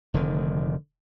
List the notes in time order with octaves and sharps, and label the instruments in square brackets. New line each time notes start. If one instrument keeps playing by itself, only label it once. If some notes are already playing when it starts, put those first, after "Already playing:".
[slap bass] F1 D3 D#3